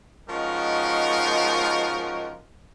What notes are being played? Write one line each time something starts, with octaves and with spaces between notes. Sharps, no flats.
F3 G#3 C#4 D#4 F#4 A#4